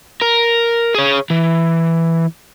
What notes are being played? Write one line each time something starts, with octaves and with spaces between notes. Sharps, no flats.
A#4
G#4 C#5
E3